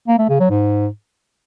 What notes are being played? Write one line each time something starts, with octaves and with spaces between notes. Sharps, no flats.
A#3
A3
C#3
F#3
G#2